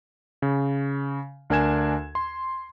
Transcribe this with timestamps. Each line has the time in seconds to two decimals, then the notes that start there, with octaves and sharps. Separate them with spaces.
0.42 C#3
1.50 D2 D4 A#4 G#5 G#6 E7
2.15 C6